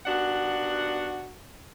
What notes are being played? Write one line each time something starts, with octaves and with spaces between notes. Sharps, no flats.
D#2 B2 D4 F#4 F#5